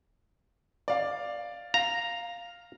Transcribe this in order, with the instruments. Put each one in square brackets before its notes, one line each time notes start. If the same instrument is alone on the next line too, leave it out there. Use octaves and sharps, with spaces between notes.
[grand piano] D5 F5
[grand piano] F5 [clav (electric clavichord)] A#5